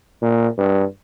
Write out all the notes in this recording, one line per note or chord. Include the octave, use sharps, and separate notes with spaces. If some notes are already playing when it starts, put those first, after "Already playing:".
A#2
G2